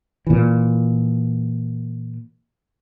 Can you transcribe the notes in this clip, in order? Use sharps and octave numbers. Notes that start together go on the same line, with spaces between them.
A#2 E3